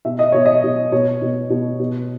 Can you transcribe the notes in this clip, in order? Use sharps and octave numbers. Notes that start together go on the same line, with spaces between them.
B2 E5
D#5
B2 C#5
D#5
B2
B2 C#5
B2
B2
B2